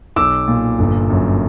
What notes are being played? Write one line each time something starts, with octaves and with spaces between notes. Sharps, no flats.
B1 D6 E6
A#2
G1
F#2